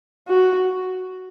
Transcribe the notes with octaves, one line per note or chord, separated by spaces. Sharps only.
F#4